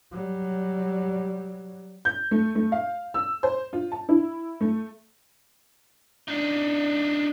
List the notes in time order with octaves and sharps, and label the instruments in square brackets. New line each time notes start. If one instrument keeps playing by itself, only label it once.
[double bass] F#3 G3
[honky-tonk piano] G6
A3
A3
F5
E6
C5
F4
A5
E4
A3
[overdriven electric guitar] D4 D#4